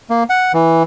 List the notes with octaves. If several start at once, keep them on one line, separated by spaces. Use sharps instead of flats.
A#3
F#5
E3